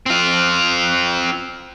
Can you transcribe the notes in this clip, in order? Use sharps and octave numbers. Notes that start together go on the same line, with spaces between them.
C4 F4